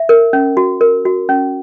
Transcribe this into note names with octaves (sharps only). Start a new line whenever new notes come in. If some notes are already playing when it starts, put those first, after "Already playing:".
Already playing: E5
A#4
C#4
F#4
A#4
F#4
C#4